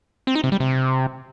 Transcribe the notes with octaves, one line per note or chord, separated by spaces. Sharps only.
C4
D#4
C3
G3
C3